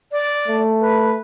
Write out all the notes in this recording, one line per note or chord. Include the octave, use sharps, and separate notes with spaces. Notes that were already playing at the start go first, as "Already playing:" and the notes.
D5
A3
B4